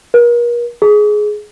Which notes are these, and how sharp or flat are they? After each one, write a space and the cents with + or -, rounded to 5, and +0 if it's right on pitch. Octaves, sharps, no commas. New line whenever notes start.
A#4 +40
G#4 +15